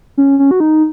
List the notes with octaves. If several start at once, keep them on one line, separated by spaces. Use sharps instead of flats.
C#4
C#4
F#4
D#4